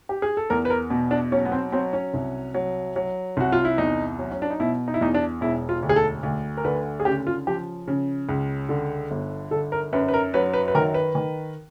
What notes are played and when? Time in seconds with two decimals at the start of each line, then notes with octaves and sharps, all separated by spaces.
0.09 G4
0.22 G#4
0.37 A4
0.50 E2 A#4
0.65 B4
0.70 A#4
0.90 B2
1.11 D4
1.32 F#3 C#4
1.45 B3
1.52 C4
1.72 F#3 C4
1.93 C#4
2.14 C2
2.54 F#3
2.96 F#3
3.37 C2 F#4
3.52 F4
3.65 E4
3.78 E2 D#4
4.19 F#3
4.31 C#4
4.42 D4
4.50 D#4
4.60 B2 E4
4.88 D#4
4.94 E4
5.01 E2 D#4
5.15 D4
5.41 E1 E4
5.69 F4
5.83 D2
5.89 G#4
5.96 A4
6.23 D2
6.57 A#4
6.65 D3 B4
7.00 G#4
7.05 C#3 G4
7.27 F4
7.47 F3 G4
7.88 C#3
8.29 C#2
8.69 D3
9.11 G1
9.51 D3 A4
9.72 A#4
9.93 F#2 B4
10.08 B4
10.14 A#4
10.34 F#3 B4
10.53 B4
10.68 B4
10.75 D#3 A#4
10.94 B4
11.15 D#3